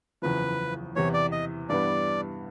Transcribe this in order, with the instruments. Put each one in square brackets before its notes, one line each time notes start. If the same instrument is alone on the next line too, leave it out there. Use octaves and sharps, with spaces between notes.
[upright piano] F#1 E2 C#3 F3 [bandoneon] B4
[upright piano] E2 C3 E3 [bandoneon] C#5
[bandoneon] D5
D#5
[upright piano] G2 E3 G3 B3 [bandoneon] D5